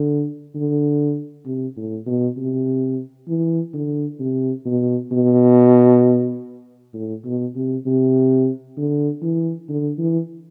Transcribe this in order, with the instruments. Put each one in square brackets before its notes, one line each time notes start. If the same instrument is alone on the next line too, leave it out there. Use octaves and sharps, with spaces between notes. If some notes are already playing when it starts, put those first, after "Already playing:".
Already playing: [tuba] D3
D3
C3
A2
B2
C3
E3
D3
C3
B2
B2
A2
B2
C3
C3
D3
E3
D3
E3